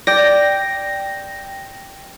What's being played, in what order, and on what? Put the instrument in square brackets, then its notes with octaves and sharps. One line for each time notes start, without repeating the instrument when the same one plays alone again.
[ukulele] D5 [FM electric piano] G5 A#6